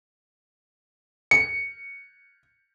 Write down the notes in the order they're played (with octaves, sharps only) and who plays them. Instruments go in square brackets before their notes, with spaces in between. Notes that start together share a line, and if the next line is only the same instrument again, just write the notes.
[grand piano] C#7